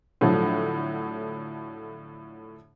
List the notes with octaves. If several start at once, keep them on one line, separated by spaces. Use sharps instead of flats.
A2 D3 F3 F#3